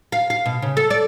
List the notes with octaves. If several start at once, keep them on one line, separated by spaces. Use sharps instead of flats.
F5
F5
B2
C#3
A4
D5